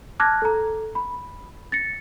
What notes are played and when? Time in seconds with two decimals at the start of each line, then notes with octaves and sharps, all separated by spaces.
0.20 A5 D6 F6 F#6 G#6 A#6
0.42 A4 A#5
0.95 B5
1.72 A6 A#6 C#7